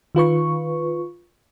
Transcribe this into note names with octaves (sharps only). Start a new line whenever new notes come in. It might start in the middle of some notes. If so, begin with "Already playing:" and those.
D#3 F4 B4 C#6